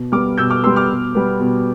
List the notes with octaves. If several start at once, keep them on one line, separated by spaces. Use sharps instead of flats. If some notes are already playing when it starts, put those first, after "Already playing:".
Already playing: B2
G3 B3 D6 F6
B2 E6 G6
D6 F6
G3 B3 C6 E6
D6 F6
B2
G3 B3
B2